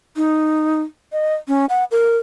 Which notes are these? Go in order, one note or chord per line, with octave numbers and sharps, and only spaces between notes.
D#4
D#5
C#4
F#5
A#4